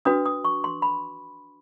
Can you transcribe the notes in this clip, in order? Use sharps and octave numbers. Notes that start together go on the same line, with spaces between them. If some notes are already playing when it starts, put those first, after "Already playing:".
D4 F#4 B4 D#6
D#6
C#6
C6
B5